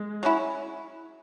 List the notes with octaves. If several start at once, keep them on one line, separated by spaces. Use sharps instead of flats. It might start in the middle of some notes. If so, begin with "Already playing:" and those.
Already playing: G#3
F#3 C#4 E4